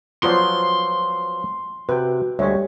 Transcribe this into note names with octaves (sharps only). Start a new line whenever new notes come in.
F3 F#3 B3 F4 C5 D5 C6
C3 F#4 B4 G5
D2 G3 G#3 G4 C#5 E5